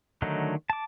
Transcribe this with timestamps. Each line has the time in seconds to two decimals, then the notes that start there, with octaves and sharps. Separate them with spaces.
0.22 D3 D#3 F#3 A3 D#4
0.70 A5 D6